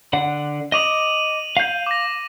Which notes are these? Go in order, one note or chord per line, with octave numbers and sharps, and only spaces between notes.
D3 D5 F#5
D#5 D6 D#6 D#7 F7 F#7
F5 G6
D6 A#6